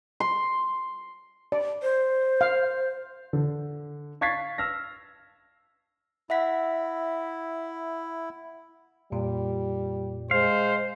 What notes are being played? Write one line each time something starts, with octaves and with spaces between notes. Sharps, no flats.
C6
D5
C5
F5
D3
F5 C#6 G#6 A6 B6 C7
E6 F6 A#6
E4 E5 F#5 B6
F2 A#2 G3 F4
G#3 C5 F5